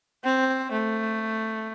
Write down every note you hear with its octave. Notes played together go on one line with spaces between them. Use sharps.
C4
A3